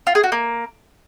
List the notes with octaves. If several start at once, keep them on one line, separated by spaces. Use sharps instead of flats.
F4
G#4
F#4
A#3